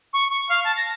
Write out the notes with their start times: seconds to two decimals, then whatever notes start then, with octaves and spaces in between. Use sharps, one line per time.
0.13 C#6
0.30 C#6
0.49 F5
0.64 A5
0.77 A#6